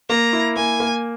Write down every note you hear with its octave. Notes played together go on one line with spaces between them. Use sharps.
A#3 A#5
E4
A#3 G#5
A#3